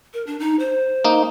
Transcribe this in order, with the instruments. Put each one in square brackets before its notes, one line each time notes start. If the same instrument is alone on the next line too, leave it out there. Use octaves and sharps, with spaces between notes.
[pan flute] A#4
D4
D#4
C5
[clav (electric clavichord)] A#3 D#4